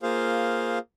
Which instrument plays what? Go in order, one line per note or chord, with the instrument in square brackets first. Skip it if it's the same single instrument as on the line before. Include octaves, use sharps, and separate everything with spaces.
[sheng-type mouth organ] A#3 F4 G#4 C5 F5